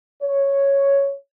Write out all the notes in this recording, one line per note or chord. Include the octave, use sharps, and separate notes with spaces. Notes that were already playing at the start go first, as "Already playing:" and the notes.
C#5